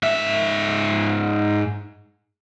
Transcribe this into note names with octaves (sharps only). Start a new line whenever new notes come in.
G#2 E5